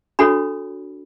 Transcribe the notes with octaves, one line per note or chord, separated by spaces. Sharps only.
D4 F#4 A4 C#5 B5